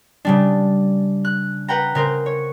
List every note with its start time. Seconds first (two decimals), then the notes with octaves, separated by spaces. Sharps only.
0.25 C#3 G3 D4
1.25 F#6
1.68 B4 F#5 G5 A#5
1.95 C#3 A#4 C5
2.26 C#5